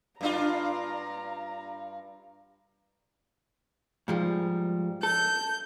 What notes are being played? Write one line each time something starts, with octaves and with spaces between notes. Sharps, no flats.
G2 D4 F4 A#5
G#2 F3 G3
A4 G6